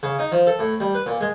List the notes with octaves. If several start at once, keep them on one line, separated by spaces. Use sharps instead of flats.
C#3
D#4
F3
A4
A2
G3
B4
A#2
G#3